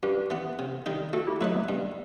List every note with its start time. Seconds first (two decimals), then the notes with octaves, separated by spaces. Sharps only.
0.03 G2 G4 B4
0.30 E3 B3
0.59 C3
0.86 D#3 G3 D#4
1.13 A3 F#4 A4
1.27 E4 G4
1.41 F#3 A3 E4 B4 D#5
1.55 G3 B3
1.69 G2